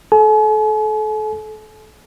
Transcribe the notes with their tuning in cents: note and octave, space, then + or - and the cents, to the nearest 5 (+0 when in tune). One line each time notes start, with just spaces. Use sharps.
A4 -30 G#5 +45